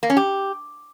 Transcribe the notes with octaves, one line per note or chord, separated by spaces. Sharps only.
A#3
C#4
G4